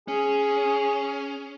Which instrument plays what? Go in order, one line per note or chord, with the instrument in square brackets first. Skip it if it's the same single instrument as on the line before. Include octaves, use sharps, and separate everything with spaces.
[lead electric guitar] C#4 [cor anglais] G#4